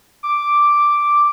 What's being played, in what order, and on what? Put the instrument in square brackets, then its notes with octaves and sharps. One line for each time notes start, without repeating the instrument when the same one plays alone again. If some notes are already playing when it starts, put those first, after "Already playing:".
[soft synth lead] D6